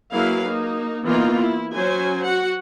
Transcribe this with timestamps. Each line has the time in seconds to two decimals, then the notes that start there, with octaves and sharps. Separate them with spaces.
0.12 F#3 A#3 E4 G#4 B4 F5
0.46 A#3 D#4
1.04 E3 A#3 B3 D#4 F4
1.38 E4
1.73 F#3 C#4 C5 G#5
2.25 F#4 F#5